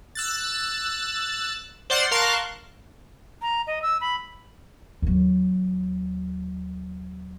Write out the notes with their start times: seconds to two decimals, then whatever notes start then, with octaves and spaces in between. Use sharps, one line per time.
0.15 E6 F#6 A6
1.90 C5 D5 F#5 C6 F6 C7
2.11 A#4 F5 A5 C6 C#6 F#6
3.42 A#5
3.67 D#5
3.82 E6
4.01 B5
5.02 D#2 F#3